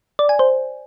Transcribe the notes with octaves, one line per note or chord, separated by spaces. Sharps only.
D5
G#5
C5